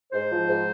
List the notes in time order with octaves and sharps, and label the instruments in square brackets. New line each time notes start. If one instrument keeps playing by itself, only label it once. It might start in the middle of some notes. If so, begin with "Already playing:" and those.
[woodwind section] G#2 C5
F3
G#2